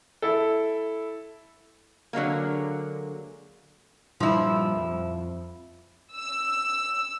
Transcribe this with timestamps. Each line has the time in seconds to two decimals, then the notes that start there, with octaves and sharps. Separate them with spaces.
0.22 E4 A4
2.13 D3 F#3 G#3 A#3
4.20 G2 A#2 F3 G3 E4
4.76 F2
6.15 E6